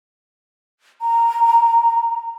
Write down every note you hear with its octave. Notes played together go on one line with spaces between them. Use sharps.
A#5